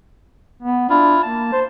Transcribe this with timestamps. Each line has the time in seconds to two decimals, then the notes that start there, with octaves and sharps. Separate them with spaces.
0.63 B3
0.90 D4 E4 F4
1.22 A#3 A5
1.53 C5